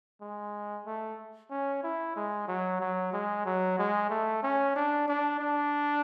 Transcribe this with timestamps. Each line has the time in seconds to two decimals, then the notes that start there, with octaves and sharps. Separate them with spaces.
0.21 G#3
0.86 A3
1.51 C#4
1.83 E4
2.16 G#3
2.48 F#3
2.80 F#3
3.13 G#3
3.46 F#3
3.79 G#3
4.10 A3
4.43 C#4
4.76 D4
5.08 D4
5.40 D4